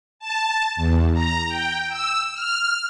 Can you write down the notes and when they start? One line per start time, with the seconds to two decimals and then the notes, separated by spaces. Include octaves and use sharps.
0.19 A5
0.76 E2
1.13 A#5
1.48 G5
1.89 E6
2.34 F6